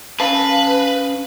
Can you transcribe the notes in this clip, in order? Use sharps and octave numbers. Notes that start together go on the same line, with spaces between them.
C#4 B4 F5 A5